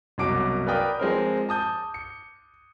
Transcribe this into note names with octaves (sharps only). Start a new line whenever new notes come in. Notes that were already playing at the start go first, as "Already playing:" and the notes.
C2 F#2 B2 D6 D7
A#4 B4 D5 F5 G5 D#6
F3 G#3 C4 A#4
A5 D#6 G6
C#7